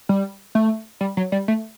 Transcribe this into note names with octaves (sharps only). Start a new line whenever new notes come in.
G3
A3
G3
F#3
G3
A3